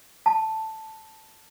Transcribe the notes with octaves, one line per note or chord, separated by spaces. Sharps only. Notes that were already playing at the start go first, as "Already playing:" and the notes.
A5